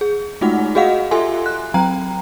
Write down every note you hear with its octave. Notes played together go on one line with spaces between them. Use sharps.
G#4
G#3 A3 D#4 F4 F#4 F#5
F#4 G#4 D#5 F5 F#5
F4 G4 A4 E5 G#5 C6
F#6
F#3 C4 G5 A#5